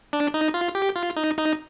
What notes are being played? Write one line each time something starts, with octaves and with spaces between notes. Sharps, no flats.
D4
D#4
F4
G4
F4
D#4
D#4